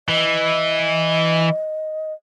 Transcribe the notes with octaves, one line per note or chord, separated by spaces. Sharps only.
E3 D#5